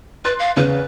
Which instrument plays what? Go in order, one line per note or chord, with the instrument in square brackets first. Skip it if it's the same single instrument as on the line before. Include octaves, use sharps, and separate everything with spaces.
[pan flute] B4 [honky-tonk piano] C6 F#6 A6
[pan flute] F5
[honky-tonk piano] E2 C#3 [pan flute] B4